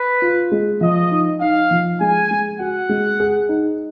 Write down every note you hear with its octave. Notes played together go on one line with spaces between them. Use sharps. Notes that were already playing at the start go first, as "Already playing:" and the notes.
Already playing: B4
F4
G#3
F3 D#5
D#4
D#4 F5
F3
G#3 G#5
G#3
F#4 F#5
G#3
G#4
D#4